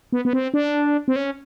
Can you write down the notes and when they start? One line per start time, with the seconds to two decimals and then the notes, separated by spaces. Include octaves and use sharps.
0.13 B3
0.25 B3
0.33 C4
0.54 D4
1.08 C4
1.16 C#4